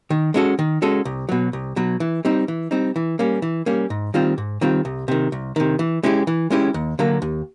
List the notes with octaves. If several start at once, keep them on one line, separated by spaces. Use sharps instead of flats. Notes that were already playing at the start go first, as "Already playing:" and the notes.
D#3
G#3 C#4 F#4 A4
D#3
G#3 C#4 F#4 A4
C2
B2 F#3
C2
B2 F#3
E3
G3 C4 D#4
E3
G3 C4 D#4
E3
G3 A#3 C#4
E3
G3 A#3 C#4
G#2
D#3 G3 C4 F4
G#2
D#3 G3 C4 F4
C2
C3 D#3
C2
C3 D#3
E3
G#3 C#4 E4 G4
E3
G#3 C#4 E4 G4
D#2
D3 F#3 A#3
D#2